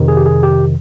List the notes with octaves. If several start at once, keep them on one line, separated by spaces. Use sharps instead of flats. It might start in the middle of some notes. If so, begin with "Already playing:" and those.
Already playing: F2 C3 D#3
G#4
G4
G#4
G4